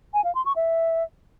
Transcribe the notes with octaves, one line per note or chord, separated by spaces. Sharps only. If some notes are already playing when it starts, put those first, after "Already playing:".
G#5
F5
C6
C#6
E5